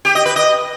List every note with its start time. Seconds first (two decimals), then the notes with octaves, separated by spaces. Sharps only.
0.05 G4
0.15 D#5
0.25 B4
0.36 D#5